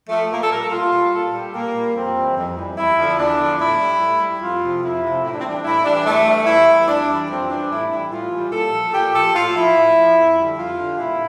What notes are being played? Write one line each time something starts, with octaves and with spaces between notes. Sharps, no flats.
F3 A3
A#2 A#3
A4
G3 A#4
A4
A#2 F4
G3
A#2 A4
G3 G4
A#2 A#3
G3
F2 C4
E3 G3
F2
E3 G3
E2 E4
D3 F3
E2 D4
D3 F3
A2 E4
G3
A2
G3
F2 F4
C3 F3
F2 E4
C3 F3
A2 E4
D4
C4
E3 G3 D4
A2 E4
E3 G3 D4
E2 A3
E3 G3
E2 E4
E3 G3
F2 D4
E3 G3
F2 C4
E3 G3 D4
A2 E4
E3 G3 E4
A2 F4
E3 G3
A#2 A4
F3
A#2 G4
F3 A4
A2 F4
F3 E4
A2
F3
F2
D3 G3
F2 F4
D3 G3
A#2 E4